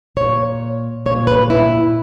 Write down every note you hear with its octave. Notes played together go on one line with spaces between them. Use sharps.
A#2 C#5
A#2 C#5
B4
E4